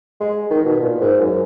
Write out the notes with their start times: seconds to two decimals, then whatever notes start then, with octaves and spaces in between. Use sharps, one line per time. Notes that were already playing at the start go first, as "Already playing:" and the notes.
0.21 G#3
0.51 D#3
0.65 B2
0.80 A#2
1.01 G#2
1.20 F#2